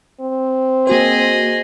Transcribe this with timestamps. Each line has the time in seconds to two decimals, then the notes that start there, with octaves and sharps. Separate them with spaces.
0.21 C4
0.87 A#3 F#4 G#4 C5 D#5